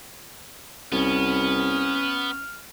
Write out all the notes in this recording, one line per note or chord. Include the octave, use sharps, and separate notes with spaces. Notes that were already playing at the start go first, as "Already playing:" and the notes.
C2 B3 C#4 F6